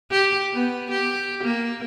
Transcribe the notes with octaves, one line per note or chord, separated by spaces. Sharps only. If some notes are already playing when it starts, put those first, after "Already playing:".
G4
B3
G4
A#3